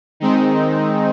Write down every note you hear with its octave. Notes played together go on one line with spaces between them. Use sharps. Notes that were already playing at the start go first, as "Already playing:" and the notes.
D#3 G#3 C4 D#4